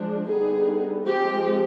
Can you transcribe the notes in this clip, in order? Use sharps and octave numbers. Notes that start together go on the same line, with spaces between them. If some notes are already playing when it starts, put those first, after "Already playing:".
Already playing: F3 G#3 D4
D3 G3 B3 D#4 G#4
F3 G#3 C4 G4